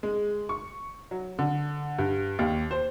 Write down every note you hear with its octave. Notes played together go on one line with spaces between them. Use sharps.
G#3
C#6
F#3
D3
G2
D#2
C5